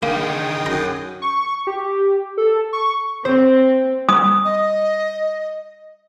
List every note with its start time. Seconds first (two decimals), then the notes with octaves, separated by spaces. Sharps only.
0.03 D3 D#3 A#3 G#4 G5 D#6
0.66 F#2 A#5
1.22 C#6
1.67 G4
2.37 A4
2.73 C#6
3.25 C4 C5
4.09 D#6
4.45 D#5